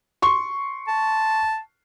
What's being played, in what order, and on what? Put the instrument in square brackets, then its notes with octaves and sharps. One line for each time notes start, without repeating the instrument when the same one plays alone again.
[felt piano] C6 C#6
[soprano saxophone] A5